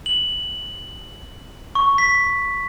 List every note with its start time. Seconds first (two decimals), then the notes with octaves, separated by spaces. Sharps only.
0.06 F#7
1.75 C#6
1.98 B6